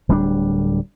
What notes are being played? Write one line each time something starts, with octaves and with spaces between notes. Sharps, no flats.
D1 G3 C4 D4